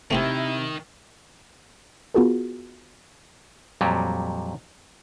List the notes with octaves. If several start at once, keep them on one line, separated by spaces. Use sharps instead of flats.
C3 D#3 A3 C4 E4 G4
B3 F4 F#4 G#4 A#4
F2 A#2 F#3 G3